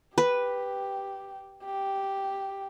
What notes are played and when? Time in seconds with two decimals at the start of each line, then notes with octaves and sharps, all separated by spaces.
0.18 G4 B4
1.64 G4